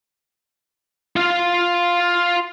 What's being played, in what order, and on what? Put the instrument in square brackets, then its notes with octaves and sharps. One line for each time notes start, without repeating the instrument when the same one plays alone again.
[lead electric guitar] F4 F5